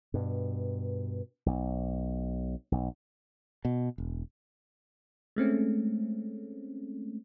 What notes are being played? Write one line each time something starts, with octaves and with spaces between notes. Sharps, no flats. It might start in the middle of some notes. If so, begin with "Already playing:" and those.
G2 B2
B1
B1
B2
E1
G#3 A3 C4 C#4